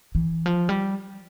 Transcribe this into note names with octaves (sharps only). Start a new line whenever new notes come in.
E3
F3
G3